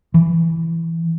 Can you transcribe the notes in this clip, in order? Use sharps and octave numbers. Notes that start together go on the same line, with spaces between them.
E3